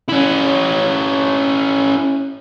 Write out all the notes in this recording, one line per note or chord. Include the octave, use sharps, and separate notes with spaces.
C#4 E4